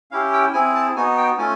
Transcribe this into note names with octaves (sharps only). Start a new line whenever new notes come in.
C#4 E4 G4 F5
G5
C4 E4 G#4 G#5
A5
B3 D#4 F#4 G#5
G5
A3 C#4 F4 G#5